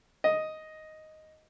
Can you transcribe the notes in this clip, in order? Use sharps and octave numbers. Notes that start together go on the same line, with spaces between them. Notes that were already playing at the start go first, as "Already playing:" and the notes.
D#5